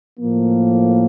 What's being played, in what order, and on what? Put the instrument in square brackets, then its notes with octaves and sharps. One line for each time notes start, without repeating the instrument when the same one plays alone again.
[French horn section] A2 F3 A#3